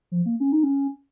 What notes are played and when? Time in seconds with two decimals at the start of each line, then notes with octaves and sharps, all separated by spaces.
0.12 F3
0.26 A#3
0.40 C#4
0.52 D#4
0.63 C#4